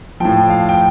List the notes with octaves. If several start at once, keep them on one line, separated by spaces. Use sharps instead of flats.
A2 F3 G5
F5
G5